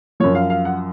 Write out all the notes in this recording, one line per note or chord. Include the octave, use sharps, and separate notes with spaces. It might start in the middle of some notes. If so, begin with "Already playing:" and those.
F#2 F3 C#5
F5
F5
F#5